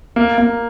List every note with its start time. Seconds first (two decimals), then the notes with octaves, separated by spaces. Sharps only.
0.16 A#3
0.38 A#3